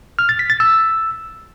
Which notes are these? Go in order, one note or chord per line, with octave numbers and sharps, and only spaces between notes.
F6
A6
B6
A6
E6